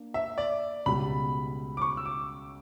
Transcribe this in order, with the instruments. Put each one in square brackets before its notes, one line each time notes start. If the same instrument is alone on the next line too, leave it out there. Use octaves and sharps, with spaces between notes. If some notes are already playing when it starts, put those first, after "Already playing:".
Already playing: [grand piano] A#3 D4
[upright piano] E5
D5
[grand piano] C#2 B2 G3 [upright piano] B5
[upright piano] D6
C#6
E6
D6